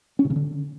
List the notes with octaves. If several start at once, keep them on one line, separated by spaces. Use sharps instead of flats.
C#4
C3
C#3
D3